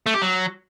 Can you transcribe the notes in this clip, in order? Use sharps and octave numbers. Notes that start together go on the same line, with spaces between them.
A3
G4
F#3